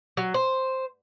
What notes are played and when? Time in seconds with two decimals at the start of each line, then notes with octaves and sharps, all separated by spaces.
0.17 F#3
0.34 C5